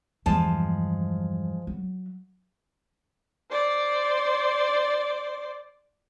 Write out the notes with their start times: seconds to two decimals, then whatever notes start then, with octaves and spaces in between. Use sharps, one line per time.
0.26 E2 G2 F3 G#3 A5
1.67 F#3
3.51 C5 D5